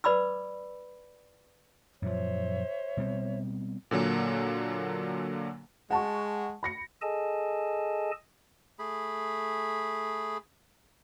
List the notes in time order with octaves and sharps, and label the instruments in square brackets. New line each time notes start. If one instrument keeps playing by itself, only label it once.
[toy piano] B4 D5 B5 D6 E6
[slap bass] F#2 A#2 F3 [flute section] C5 C#5 E5
[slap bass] B2 G3 C4
[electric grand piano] A#2 D3 F#3 A#3
[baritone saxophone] G#3 [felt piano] F#5 A5 C#6
[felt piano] B5 A#6 C#7
[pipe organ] G#4 A4 D#5 G#5 A5
[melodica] A3 G#4 B5